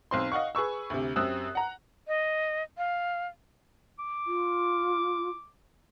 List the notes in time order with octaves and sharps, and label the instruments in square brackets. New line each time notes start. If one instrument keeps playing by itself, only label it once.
[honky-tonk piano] B1 C4 C6
D#5 F5 F#5 C#6
G#4 B4 C#6 E6
D2 C3
F#2 C4 G4 D#6 E6 F#6
F#5 A#5
[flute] D#5
F5
[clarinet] D6
[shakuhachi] F4